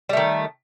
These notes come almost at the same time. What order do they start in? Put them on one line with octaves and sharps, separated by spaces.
G3 A3 D#3